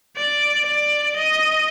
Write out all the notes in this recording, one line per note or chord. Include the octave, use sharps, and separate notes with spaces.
D5
D5
D#5